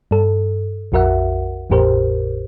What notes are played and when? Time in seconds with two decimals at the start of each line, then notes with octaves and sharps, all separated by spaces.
0.11 G2 A4
0.92 A#1 F2 F#4 A#4 E5 F#5
1.70 G#1 E2 A2 G4 A#4 C5